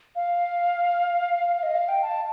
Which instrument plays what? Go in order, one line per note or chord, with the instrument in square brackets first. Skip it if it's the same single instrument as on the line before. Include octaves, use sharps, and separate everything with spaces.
[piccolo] F5
D#5
F5
G5
A5